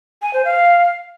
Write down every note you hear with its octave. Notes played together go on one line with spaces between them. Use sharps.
G#5
C5
F5